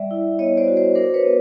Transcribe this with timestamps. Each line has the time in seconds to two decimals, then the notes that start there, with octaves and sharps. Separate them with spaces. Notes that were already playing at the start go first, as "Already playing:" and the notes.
Already playing: G3 D5 E5
0.11 E4
0.39 B3 C#5 D#5
0.57 C5 D5
0.68 F#4
0.77 C5 D5
0.95 D4 A#4 C5
1.14 B4 C#5
1.24 B3